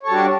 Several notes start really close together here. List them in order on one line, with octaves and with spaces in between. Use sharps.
C#5 A4 G3 F#4 D4